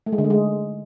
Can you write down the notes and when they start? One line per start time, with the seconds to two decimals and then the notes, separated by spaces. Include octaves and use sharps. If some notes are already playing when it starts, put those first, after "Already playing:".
0.06 A3
0.12 G#3
0.18 D3
0.24 A3
0.30 G#3